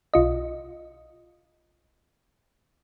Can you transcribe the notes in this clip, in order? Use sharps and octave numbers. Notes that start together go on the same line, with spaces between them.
B1 F4 D#5